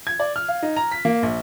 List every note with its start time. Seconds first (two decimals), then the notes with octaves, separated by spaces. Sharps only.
0.07 G#6
0.20 D5
0.36 F6
0.48 F5
0.63 D#4
0.76 A#5
0.91 B6
1.05 A#3
1.23 A#1